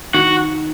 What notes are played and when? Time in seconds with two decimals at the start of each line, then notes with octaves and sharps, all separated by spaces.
0.14 D#3 F#4